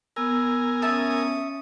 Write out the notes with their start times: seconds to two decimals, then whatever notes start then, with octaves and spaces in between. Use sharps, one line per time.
0.16 B3 A#4 G#5 E6
0.82 C#4 E5 A5 D#6